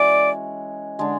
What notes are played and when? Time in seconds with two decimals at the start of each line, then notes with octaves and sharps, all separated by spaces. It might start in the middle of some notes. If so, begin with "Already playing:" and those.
Already playing: E3 G#3 C#4 F#4 D5
0.99 D3 G#3 D4